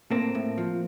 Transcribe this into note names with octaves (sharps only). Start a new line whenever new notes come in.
A2 A#3 C4
A2
F3